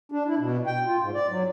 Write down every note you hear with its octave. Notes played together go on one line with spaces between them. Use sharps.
D4
E4
B2
G5
F4
G#2
D5
F#3